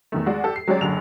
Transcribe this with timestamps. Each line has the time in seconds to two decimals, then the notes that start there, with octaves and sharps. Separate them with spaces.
0.12 E2 D#3 A3
0.26 G#3 F#4 D5
0.44 G4 A4
0.56 C7
0.67 F#3 G#3 C#4 G4 C#5 D5
0.81 F#1 F#2 D3 F7